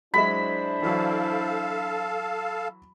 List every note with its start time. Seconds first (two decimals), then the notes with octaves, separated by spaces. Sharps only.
0.14 F#3 G#3 D4 E4 C5 E5 B5
0.83 E3 F#3 A4 F5 A5